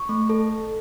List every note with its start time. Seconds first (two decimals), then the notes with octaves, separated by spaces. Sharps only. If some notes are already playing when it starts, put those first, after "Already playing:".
Already playing: C#6
0.09 A3
0.29 A4